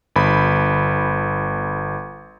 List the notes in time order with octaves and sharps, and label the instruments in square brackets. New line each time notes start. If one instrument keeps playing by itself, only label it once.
[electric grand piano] G1 B5